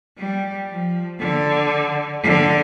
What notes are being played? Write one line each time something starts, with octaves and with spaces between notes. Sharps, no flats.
G3
F3
D3
D3